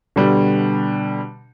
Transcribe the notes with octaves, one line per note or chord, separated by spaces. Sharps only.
B2 D3 G3